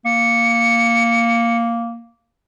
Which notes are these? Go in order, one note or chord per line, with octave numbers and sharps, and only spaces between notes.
A#3 C#7